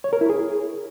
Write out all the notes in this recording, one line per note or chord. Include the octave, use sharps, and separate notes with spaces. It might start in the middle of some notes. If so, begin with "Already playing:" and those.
C#5
A#4
E4
G#4